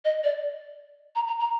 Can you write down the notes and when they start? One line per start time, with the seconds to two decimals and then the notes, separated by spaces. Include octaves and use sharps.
0.05 D#5
0.24 D5
1.16 A#5
1.27 A#5
1.40 A#5